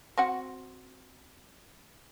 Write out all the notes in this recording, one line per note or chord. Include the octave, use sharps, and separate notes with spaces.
C4 F#4 F#5